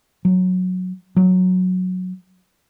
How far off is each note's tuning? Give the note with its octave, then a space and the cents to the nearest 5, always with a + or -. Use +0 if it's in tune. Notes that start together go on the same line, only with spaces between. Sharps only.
F#3 -10
F#3 -10